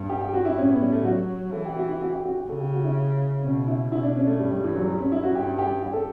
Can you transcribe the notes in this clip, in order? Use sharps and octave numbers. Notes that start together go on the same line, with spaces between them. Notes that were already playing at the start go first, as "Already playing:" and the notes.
Already playing: G2
G4
G4
F#4
E4
A2 C#4
B3
G3
A3
F#3 F#4
E3 A4
G4
F#4
E4
F#4
G4
F#4
G4
C#3 A4
G4
F#4
E4
B2 C#4
E4
B2 E4
D4
C#4
A3
G2 G3
G3
E3
F#3
G3
C#4
E4
F#4
G2 G4
G4
G4
A4